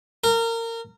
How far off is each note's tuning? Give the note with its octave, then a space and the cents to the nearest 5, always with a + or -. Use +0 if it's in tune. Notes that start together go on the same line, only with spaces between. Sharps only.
A#4 -25